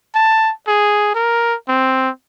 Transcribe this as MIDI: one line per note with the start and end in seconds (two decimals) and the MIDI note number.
0.15 0.52 81
0.68 1.13 68
1.15 1.55 70
1.69 2.10 60